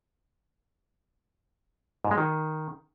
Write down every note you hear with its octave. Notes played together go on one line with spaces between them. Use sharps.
G#2
G#3
D#3